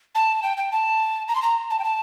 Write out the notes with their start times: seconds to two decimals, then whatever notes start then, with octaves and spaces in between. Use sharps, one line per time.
0.15 A5
0.43 G5
0.57 G5
0.72 A5
1.28 A#5
1.35 C6
1.42 A#5
1.70 A5
1.79 G5
1.84 A5